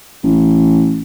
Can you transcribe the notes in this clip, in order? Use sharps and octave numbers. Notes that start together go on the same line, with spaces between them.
A1